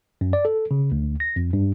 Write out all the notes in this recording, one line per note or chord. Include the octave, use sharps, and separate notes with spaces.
F#2
D5
A4
C#3
D2
A#6
F2
G2